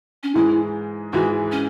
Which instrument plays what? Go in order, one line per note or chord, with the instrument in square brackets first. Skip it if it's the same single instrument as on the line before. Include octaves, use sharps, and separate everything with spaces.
[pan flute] C#4
[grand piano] G#2 E3 G#3 [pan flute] E4
[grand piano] G#2 E3 G#3 [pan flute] F#4
[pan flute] C#4